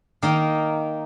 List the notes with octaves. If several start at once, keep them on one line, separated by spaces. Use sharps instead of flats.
D#3 A#3 D#4 A#4